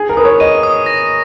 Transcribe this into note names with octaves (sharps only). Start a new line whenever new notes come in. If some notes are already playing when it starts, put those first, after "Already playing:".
Already playing: G#4
A#4
B4 D#6
C#5
D#5 D#7
D#6
A#6